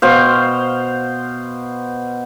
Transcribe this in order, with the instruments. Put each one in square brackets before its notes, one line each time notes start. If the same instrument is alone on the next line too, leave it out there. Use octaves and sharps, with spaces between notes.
[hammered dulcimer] B2 C5 F5